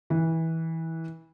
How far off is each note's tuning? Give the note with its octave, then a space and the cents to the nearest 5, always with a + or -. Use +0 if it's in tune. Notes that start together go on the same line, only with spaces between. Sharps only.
E3 -20